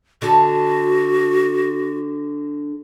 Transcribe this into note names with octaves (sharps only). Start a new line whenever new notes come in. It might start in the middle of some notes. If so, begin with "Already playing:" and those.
D3 F#4 A4